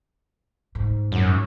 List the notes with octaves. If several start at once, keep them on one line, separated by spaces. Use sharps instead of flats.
G#2
F#2